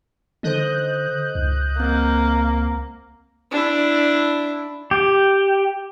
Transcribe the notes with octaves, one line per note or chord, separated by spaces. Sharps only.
D3 D#4 A4 C5 D#5 F#6 G6
C#2
A#3 C4
D4 E4
G4